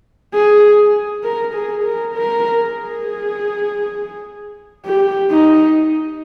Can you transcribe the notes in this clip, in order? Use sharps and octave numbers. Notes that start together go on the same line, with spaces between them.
G#4
A#4
G#4
A#4
A#4
G#4
G4
D#4